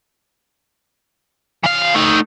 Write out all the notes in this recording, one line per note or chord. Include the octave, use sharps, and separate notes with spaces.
E3 F5
A3 D#4